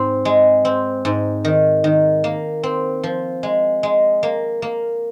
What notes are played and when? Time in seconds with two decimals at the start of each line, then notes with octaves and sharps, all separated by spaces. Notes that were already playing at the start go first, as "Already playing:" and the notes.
Already playing: G#2 C4
0.25 G#3
0.65 C4
1.05 G#2
1.45 D#3
1.84 D#3
2.24 A#3
2.63 C4
3.03 F3
3.43 G#3
3.83 G#3
4.23 A#3
4.62 A#3